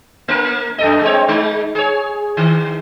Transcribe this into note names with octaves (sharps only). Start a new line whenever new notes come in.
A#3 A#4
F#2 A4 D#5
G#3 C4 C#5
G#3 D#4
G#4 C#5
D#3